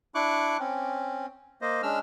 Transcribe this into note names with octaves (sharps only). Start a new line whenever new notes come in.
D4 E4 C#6 D6 F#6
C4 C#4
A#3 C5 D#5
G#3 C#4 D4 E6 F6